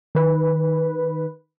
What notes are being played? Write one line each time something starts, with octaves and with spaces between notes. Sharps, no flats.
D#3 B4